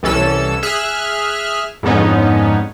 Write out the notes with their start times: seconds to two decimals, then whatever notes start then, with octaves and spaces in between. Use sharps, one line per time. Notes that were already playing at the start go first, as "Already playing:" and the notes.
0.03 C2 E3 C#4 A4 E6
0.63 G#4 E5 F6 F#6
1.83 F2 G#2 D3 B3 C#4 D#4